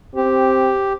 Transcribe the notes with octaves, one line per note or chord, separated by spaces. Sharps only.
C4 G4